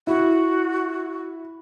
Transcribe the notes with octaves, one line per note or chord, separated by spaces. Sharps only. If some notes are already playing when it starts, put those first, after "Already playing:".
E4 F#4